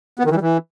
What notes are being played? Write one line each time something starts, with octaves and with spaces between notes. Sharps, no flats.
B3
D#3
E3
G3
E3